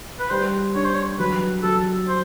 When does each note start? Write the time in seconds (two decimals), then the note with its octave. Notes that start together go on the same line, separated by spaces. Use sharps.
0.19 B4
0.30 G3 C5
0.75 D4 C#5
0.84 C5
0.94 C#5
1.19 F#3 B4
1.63 F#3 A4
2.08 C5